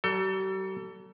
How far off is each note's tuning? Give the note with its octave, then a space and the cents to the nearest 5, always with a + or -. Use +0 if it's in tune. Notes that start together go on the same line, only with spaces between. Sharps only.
G3 -45 A4 +25